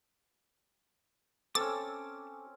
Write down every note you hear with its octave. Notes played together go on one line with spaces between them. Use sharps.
C4 C#4 A4 D6 E6 A6